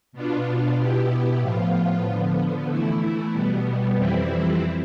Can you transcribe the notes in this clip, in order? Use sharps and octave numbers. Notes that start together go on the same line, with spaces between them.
B2 B3 D4 F4
B2 B3 E4 G4
A2 F3 B3 F4
D3 F3 B3
E3 A3 E4
B2 G3 B3
F2 E3 G3 C4 E4